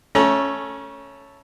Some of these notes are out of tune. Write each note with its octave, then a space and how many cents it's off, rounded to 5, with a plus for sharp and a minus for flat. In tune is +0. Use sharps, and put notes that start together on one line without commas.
A3 +0 C#4 +0 A#5 +40